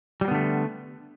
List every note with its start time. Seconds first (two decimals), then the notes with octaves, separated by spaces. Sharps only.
0.21 G3
0.25 F#3
0.28 B3
0.31 D3
0.34 A3